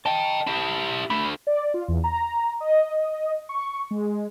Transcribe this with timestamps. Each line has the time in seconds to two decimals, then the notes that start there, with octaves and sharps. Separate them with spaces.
0.06 D#5 G5 A5
0.47 E4 G4
1.10 D3 A3 B5
1.47 D5
1.74 F4
1.88 E2
2.04 A#5
2.60 D#5
3.49 C#6
3.91 G#3